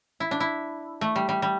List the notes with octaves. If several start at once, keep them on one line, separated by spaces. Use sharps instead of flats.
E4
D4
E4
A3
G3
G3
G3